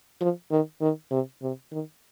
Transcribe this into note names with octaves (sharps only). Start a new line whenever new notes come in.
F3
D#3
D#3
C3
C3
D#3